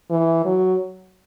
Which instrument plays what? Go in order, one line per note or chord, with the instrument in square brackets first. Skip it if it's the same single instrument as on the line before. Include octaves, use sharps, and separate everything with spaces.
[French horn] E3
F#3